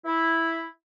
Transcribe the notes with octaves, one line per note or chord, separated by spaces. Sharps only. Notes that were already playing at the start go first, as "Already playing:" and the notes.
E4